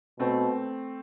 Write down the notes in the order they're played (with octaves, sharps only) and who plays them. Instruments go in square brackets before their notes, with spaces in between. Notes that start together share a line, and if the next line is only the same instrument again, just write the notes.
[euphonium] B2 [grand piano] A3 C4